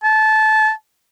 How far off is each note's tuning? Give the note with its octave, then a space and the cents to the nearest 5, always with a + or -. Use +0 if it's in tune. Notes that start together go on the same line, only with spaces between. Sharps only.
A5 -20